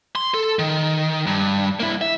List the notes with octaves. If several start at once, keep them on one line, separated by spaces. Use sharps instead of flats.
C6
A4
D#3
G2
A#3 E4
E5